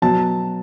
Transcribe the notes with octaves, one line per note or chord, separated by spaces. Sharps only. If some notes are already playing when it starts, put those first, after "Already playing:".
B2 F#3 A5